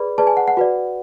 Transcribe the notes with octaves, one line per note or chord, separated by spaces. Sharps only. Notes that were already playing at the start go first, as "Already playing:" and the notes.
Already playing: G#4 B4 D5 B5
G#4 B4 D5 A5
G#5
F#5
F#5
F#4 B4 D5